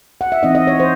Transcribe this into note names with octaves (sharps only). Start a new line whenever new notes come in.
F#5
E5
E3 C4 D#4 D#5
D#5
C#5
E3 C5